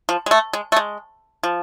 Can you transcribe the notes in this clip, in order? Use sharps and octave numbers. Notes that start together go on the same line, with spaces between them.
F3
G#3
A3
G#3
A3
G#3
F3